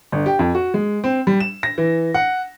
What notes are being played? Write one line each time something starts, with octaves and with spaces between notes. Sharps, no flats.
G1
G4
F2
F#4
G#3
C4
G3
E7
A#6
E3
F#5